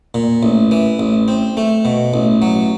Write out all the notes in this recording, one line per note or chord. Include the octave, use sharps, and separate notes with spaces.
A#2
A1
E3
A1
C4
A3
B2
A1
F#3